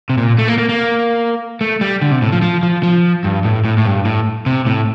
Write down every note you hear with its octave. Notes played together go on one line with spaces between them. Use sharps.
C3
A#2
A3
A#3
A#3
A#3
A3
G3
D3
C3
A2
F3
F3
F3
F3
G2
A2
A2
A2
G2
A2
C3
A2